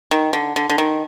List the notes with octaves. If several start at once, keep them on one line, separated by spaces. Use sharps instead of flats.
D#3
D3
D3
D3
D#3